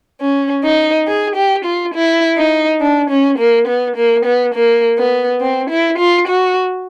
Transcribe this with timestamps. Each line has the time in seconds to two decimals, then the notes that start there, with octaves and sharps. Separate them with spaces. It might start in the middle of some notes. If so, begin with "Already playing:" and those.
0.21 C#4
0.64 D#4
1.07 G#4
1.36 G4
1.65 F4
1.94 E4
2.38 D#4
2.81 D4
3.10 C#4
3.38 A#3
3.67 B3
3.96 A#3
4.25 B3
4.55 A#3
4.98 B3
5.41 C4
5.70 E4
5.98 F4
6.28 F#4